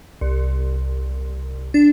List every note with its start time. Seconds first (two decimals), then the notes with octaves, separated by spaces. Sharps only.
0.21 C2
1.74 D4